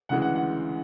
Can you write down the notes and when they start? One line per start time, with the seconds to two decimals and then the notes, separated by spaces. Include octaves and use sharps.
0.09 D2 C#3 E3 G#3 F#5
0.22 F#5
0.35 F#5